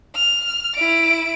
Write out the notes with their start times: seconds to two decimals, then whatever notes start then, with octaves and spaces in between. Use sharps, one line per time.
0.15 F6
0.75 E4 D7